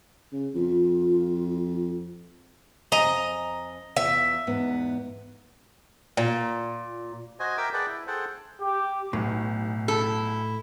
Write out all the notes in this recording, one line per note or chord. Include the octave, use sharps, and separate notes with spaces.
C#3
F2 F4
F2 D#5 G#5 A#5
E2 F4 E5
E2 G#2 B3
A#2
F#4 C5 D#5 G#5
A#4 E5 G5 D6 E6
G#4 B4 D5 F#5 G5 A5
E4
G#4 A4 C5 F#5 G5 A5
G4
B1 A2
E4 A4